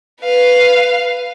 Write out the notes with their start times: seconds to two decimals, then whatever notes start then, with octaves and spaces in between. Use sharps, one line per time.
0.21 B4 F5